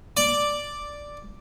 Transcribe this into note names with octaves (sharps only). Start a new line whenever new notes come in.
D5